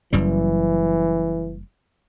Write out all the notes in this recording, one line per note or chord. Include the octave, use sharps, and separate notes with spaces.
F#1 F#2 E3 G3